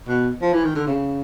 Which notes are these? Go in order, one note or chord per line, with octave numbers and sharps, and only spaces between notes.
B2
F3
E3
D#3
D3
C#3